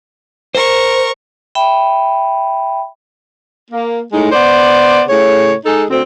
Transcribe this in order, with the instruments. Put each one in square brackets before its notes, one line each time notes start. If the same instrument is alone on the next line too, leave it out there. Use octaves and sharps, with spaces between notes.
[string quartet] A#4 C#6 [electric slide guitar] C5
[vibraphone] E5 G5 B5
[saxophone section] A#3
A2 G#3 D#4
B3 C5 D5
A2 C#3 C#5
G#3 D#4 G#4 A4
D2 C4